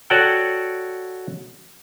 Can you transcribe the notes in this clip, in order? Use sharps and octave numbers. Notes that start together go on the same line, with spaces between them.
F#4 A4 C#5 D5 F#5 G5